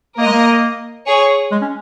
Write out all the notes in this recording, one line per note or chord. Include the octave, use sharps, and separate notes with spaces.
A#3 A#4 D#5
G#3
A#3
G#4 C#5
G#3
C#4